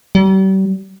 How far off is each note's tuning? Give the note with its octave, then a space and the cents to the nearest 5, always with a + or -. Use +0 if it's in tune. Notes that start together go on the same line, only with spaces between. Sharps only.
G3 -40